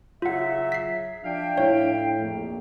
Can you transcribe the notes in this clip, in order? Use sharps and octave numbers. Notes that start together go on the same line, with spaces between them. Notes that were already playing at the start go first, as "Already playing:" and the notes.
C#3 F#3 F4 E5 F#5
B6 C7
F3 D4 E5 F5 G5
A2 D4 E4 C#5
A#1 F2 A#3